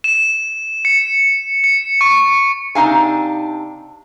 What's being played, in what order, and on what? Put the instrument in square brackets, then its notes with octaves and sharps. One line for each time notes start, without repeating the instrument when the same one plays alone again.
[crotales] E7
C#7
C#7
C#6
[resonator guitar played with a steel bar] C3 D4 D#4 F5 G#5